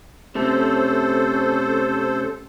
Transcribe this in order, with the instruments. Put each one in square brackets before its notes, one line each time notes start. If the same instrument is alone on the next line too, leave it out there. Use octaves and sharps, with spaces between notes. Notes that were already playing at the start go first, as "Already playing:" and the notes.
[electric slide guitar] C3 A3 [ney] C#4 [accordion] A4 C5